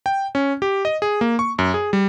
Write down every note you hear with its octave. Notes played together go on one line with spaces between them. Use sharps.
G5
C#4
G4
D#5
G#4
A#3
C#6
F#2
G#4
G3